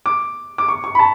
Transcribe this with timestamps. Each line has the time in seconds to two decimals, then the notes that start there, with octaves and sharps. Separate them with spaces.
0.06 D6
0.58 D6
0.68 C#6
0.84 C#6
0.95 B5
0.99 A5